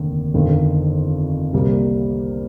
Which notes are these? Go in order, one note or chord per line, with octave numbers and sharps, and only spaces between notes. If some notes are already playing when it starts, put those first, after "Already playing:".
Already playing: F1 D#2 D3
G1 F2 D#3
C2 C3 G3 A#3